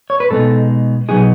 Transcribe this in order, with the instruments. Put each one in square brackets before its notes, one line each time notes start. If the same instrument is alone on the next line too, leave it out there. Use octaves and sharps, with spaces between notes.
[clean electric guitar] C#5
B4
B2 G#3 B3 D#4 A4
B2 F#3 B3 D#4 G#4